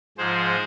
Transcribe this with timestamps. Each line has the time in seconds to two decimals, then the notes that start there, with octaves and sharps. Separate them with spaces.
0.18 G#2 F3 G#3 G#4 C5